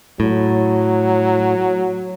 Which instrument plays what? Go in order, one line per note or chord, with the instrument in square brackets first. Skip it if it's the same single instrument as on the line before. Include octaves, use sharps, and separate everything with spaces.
[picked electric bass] A2 [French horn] F#3